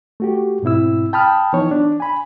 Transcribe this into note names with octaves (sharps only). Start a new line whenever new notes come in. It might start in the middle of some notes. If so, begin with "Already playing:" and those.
A3 F#4 G4
G#2 B2 C4 E4 E6
G5 A5 B5 D#6 F6
E3 F3 B3 D#4 C#5
D4
G#5 B5